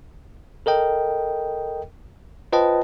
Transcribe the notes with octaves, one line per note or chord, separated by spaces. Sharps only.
A4 A#4 D#5 G5
F4 B4 C5 D#5 G5 A5